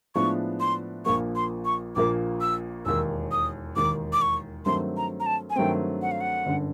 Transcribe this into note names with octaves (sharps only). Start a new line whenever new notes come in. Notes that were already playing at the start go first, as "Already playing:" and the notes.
A2 F3 G#3 B3 D4 C#6
C6
A#1 A#2 F3 A#3 C#6
C6
C#6
A#1 A#2 F3 A#3 D6
E6
E1 D#2 D#3 E6
D#6
E1 D#2 D#3 D6
D6
C#6
G2 D#3 F#3 A3 C4 C6
A#5
A#5
A5
G#5
G2 D#3 F#3 A3 C4 G5
F#5
F5
F#5
G1 F#2 D3